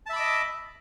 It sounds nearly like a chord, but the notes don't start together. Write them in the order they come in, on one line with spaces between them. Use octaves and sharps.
A5 E5 B5 D6 D#5